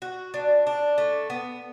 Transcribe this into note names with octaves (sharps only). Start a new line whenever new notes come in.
F#4
D4
D4
A3
B3